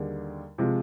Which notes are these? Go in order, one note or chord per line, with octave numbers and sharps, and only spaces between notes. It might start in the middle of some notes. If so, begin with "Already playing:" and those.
Already playing: D#2 D3 G3 D4 G#4
C3 F3 G#3